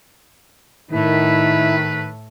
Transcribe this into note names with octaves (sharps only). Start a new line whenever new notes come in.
A2 D#3 A3 E4 B4